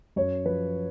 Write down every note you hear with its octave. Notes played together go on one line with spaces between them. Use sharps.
F#2 C#5
F3 B4